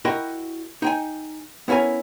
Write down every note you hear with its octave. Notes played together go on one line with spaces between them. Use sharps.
E4 F#4 A#4 D#5 G5
D#4 G5 G#5
B3 C#4 E4 A#4 G#5